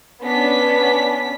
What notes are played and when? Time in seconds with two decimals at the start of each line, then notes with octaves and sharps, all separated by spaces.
0.24 B3 C#4 D4 B6